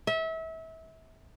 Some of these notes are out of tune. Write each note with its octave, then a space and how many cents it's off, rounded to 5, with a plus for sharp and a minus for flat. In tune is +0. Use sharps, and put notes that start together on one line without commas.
E5 -30